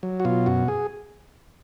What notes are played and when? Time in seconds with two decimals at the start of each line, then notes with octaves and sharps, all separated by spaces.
0.03 F#3
0.20 F#4
0.25 B2 F4
0.46 F#2 F#4
0.68 G#4